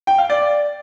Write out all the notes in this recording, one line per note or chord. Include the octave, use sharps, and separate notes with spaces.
G5
F5
D5